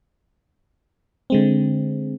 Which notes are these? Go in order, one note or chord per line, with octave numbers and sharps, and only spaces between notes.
D3 G#3 C4